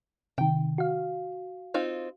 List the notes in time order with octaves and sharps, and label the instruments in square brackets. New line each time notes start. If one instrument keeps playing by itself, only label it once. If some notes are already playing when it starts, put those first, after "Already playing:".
[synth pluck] C3 D#3 [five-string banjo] G5
[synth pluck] F#4 F5
[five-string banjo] C4 D#4 F4